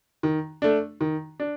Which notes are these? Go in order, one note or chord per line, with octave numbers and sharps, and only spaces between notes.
D#3
A3 D4
D#3
D4